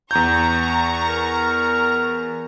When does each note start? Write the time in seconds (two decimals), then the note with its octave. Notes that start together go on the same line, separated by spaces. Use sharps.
0.11 E2 A#5 C#6 G6
1.08 A#4